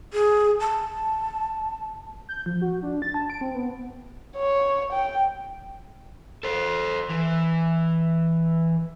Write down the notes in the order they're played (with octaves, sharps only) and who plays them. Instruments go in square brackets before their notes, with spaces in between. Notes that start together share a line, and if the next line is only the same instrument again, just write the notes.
[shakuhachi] G#4
A5
[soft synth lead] G6
F3
F#4
D4
A6
A5
D7
C4
B3
[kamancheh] C#5
G5
[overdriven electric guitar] A4 C5
E3